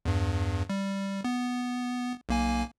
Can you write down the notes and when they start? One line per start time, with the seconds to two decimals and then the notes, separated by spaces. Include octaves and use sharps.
0.05 E2 G2
0.70 G3
1.24 B3
2.29 B1 A#3 G#5